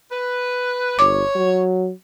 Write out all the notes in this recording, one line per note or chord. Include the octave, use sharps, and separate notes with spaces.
B4
G1 C#5 D6
F#3